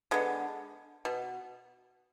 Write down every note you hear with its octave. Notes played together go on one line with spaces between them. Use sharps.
D3 G#3 B3
B2